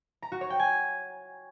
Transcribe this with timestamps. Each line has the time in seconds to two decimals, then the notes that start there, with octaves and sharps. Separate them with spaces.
0.22 A#5
0.32 F#4
0.41 C#5
0.50 G5
0.60 G#5